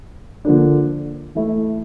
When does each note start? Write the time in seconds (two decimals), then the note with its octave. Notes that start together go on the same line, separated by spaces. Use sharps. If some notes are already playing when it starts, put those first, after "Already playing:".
0.45 D3 F3 A#3 D4
1.35 E3 A3 E4